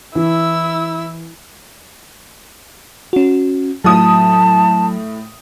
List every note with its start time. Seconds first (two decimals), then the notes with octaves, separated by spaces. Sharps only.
0.15 E3 E4 E6
3.13 C#4 F#4
3.84 A2 F#3 A5 D#6